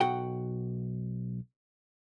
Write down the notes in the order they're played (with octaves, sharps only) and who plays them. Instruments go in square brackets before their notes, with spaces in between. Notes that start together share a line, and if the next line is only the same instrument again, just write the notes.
[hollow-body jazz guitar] B1 F#4 F#5 G5